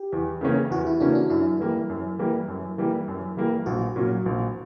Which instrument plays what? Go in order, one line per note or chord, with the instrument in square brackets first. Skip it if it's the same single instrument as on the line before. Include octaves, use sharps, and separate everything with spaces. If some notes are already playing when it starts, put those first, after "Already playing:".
Already playing: [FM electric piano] G4
[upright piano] E2
C#3 E3 A#3 C#4
[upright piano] E2 [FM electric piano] F#4
[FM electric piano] E4
[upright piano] C#3 E3 A#3 C#4 [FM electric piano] D4
[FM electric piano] D4
[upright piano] F#2 [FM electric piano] E4
[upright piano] E3 G3 A#3
F#2
E3 G3 A#3
F#2
E3 G3 A#3
F#2
E3 G3 A#3
[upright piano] A#1 [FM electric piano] F#4
[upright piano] A#2 F#3 C#4
A#1